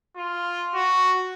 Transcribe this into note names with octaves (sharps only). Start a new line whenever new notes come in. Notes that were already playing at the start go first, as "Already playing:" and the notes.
F4
F#4